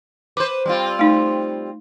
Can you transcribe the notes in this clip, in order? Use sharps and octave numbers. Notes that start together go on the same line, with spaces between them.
B4 C5 D6
G3 C4 F4
A3 D#4